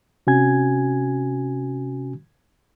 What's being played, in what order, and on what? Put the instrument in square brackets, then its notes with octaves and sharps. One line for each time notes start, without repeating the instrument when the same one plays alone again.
[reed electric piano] C3 C#4 F#4 G#5 G#6